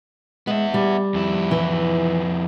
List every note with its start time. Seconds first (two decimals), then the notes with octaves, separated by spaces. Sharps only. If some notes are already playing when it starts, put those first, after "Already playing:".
0.47 G#3 B3 E5
0.74 G3
1.14 F2 E4
1.51 E3